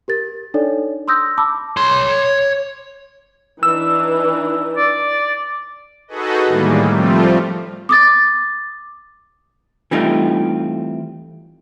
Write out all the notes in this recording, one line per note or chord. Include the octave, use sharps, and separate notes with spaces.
G4 A#4 A6
D4 D#4 A4 C#5 D5
C6 D#6 E6 G6 A#6
A5 B5 D6 E6
C#5 C6
E3 D4 D#4 E6
D5
D#4 F#4 G#4 A4 B4 D#5
A2 D#3 E3 G3 G#3 A#3
F3 G3 A3 C4 F4
D6 D#6 A6
E3 G3 A3 C4 D#4 F4